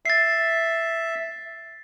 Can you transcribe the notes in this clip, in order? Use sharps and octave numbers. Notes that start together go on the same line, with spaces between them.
E5 A6 C7